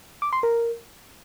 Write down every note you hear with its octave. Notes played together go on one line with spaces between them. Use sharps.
D6
C6
A#4